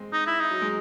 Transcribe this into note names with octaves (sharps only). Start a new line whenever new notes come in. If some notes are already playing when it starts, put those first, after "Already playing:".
Already playing: G#3 C4
D#4
E4
D#4
F#3
G#3